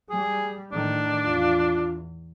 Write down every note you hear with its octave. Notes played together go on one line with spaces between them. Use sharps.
G3 G#4
A2 D#3 D4
E2 F4